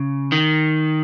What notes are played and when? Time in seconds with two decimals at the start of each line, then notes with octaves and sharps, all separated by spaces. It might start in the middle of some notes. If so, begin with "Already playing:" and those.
Already playing: C#3
0.32 D#3